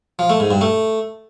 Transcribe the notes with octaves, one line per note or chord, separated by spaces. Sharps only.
F3
A3
G#2
G2
A3